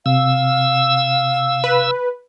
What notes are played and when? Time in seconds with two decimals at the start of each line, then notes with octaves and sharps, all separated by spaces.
0.06 C3 F5 E6
1.64 B4